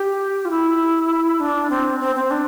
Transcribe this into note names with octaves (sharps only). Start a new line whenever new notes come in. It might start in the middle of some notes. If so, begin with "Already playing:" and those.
Already playing: G4
F4
E4
D4
C4
C4
C4
D4